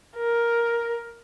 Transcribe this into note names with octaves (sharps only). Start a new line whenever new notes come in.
A#4